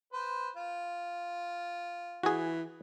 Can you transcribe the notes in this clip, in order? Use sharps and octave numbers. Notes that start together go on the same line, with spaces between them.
B4 C5
F4
E3 F#4 G#4